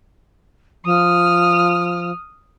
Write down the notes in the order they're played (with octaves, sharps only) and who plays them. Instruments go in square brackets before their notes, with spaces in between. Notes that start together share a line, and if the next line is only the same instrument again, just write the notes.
[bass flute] F3 [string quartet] D#6 F6